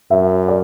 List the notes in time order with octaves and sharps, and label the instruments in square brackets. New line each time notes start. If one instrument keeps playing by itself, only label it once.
[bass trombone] F#2 [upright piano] E5
[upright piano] D5